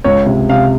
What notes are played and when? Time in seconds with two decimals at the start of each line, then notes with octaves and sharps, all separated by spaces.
0.04 C#2 C#5
0.26 C3
0.49 C3 F5